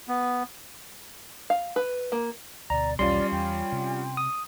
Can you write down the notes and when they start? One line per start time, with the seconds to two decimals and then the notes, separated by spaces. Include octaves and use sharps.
0.08 B3
1.50 F5
1.76 B4
2.12 A#3
2.70 D2 B2 D5 A#5
2.99 B1 E2 G3 C#4 F4 D5 C6
3.32 E2 G5
3.72 C3
4.17 D#6